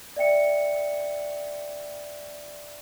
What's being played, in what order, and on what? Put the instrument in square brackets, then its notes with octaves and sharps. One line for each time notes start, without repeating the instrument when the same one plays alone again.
[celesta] D5 E5 G5 C#7